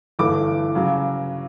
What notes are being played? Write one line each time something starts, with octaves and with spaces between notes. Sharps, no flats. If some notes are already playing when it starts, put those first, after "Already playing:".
G1 G2 E3 A3 D6
C#3 F#3